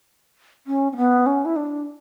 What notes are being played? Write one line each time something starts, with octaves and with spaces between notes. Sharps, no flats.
C#4
C#4
B3
C#4
E4
D4